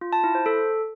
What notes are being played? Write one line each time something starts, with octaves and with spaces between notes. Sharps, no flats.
F4
A5
E4
C5
A4